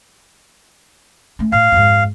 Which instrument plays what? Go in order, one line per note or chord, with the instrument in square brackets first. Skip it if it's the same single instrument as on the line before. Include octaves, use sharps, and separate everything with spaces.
[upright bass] A3 C#4
[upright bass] A2 [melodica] F5
[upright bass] F2 G#2